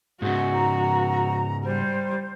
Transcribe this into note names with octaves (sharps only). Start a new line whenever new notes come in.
G#2 C#3 F#4
A#5
G3 C5